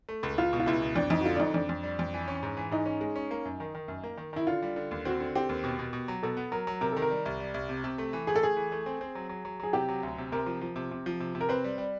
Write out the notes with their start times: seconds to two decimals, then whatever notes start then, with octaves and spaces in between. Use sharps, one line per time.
0.09 A3
0.23 C#2
0.38 C#2 F4
0.53 B2
0.60 F4
0.66 C#2 E4
0.82 B2
0.96 F2 D4
1.10 F2 D#4
1.21 F#4
1.25 D3 F4
1.35 D4
1.39 F2 D#4
1.54 F2 D4
1.69 F2
1.83 G3
1.99 F2
2.14 E3
2.28 C#4
2.43 G#2
2.57 E3
2.71 G#2 D#4
2.86 C#4
3.01 G#3
3.16 C#4
3.31 A#3
3.45 F#2
3.60 D#3
3.75 D#3
3.88 F#2
4.04 A#3
4.17 D#3
4.33 D#3 E4
4.47 D3 F4
4.62 G3
4.76 D3
4.91 D#2
5.05 C4 F#4
5.20 D3
5.35 C4 G4
5.49 D#2
5.64 B2
5.79 B2
5.93 B2
6.08 F#3
6.23 B2 A4
6.37 B3
6.52 F#3 A#4
6.67 F#3
6.81 C3 A#4
6.92 D#3 A4
7.02 A#4
7.10 G3
7.25 C2
7.39 G3
7.54 C2
7.69 C3
7.84 C3
7.98 A3
8.13 E3
8.27 A3 G#4
8.36 A4
8.43 A3 G#4
8.57 E3
8.72 A3
8.86 C4
9.01 C4
9.15 F#3
9.29 F#3
9.45 F#3
9.60 F#3 G#4
9.73 C3 G4
9.89 F#3
10.03 D2
10.18 C3
10.32 C3 A#4
10.46 F3
10.61 F3
10.76 C3
10.91 C3
11.06 F3
11.20 C3
11.35 C3
11.41 A#4
11.49 C4 B4
11.64 G3
11.78 G3